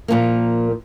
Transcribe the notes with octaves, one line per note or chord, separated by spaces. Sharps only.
A#2 F3 A#3